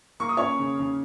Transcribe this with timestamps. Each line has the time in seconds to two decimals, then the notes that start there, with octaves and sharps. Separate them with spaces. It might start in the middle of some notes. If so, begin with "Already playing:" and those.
0.20 A#3 C#6
0.29 D#6
0.37 C#4 C#5 C#6
0.59 C#3
0.79 C#3